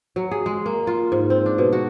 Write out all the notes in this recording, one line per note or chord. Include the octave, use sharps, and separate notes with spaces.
F#3
G#4
G#3
A#3
F4
G#2
C4
D4
B2
F#4